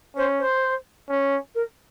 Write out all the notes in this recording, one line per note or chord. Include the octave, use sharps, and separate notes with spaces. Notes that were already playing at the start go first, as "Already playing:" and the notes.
C#4 C5
C5
C#4
A#4